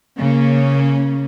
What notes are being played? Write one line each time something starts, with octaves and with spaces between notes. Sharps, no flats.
C#3 A#3 C#4